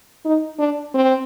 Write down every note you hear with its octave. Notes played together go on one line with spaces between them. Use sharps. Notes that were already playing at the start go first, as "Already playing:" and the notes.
D#4
D4
C4